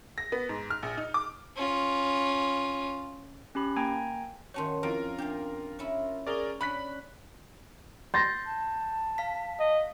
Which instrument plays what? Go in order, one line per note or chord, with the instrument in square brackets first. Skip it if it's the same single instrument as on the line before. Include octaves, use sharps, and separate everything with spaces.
[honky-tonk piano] A#6
B3
G#2
F6
A#1
D#4
D6
[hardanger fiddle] C#4 F4
[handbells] C#4 G4 B5
A#3 G5 G#5 A#5 G#6
[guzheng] D#3 C#4 F#4 [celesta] C#5 A5 C6
[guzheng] F2 [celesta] E4 D7 [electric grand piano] F4 A#4
[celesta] D4 [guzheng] G4 F5
[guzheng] C#4 E4
[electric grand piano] G#4 A#4 D5 [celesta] C#6 F7 G7
[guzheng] C#4 D4 [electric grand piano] B5 F#6 B6
[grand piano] C6 A6 A#6 [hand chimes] G6
[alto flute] A5
[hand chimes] F5 B6
[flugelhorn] D#5